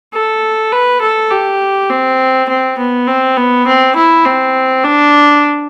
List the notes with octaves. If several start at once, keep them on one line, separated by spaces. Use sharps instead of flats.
A4
B4
A4
G4
C4
C4
B3
C4
B3
C4
E4
C4
D4